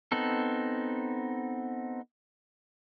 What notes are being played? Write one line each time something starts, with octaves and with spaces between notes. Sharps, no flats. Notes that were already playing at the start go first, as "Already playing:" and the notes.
B3 C4 D#4 A4